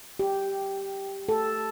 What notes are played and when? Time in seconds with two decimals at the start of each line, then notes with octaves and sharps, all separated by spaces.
0.19 G4
1.29 A4